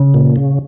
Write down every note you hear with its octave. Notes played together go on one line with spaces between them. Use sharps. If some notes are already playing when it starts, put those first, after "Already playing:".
Already playing: C#3
A#2
C#3